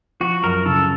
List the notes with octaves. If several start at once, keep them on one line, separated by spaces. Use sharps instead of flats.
F3 F#4
F#2 A#4
C#3 A4